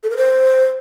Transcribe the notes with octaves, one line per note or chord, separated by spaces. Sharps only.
A4
A#4
C5